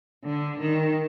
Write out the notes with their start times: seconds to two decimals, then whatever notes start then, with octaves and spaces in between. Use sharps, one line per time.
0.25 D3
0.59 D#3